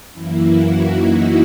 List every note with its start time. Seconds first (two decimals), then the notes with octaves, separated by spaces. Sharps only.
0.13 F#2 E3 A#3 E4
0.50 F#4
0.88 D#4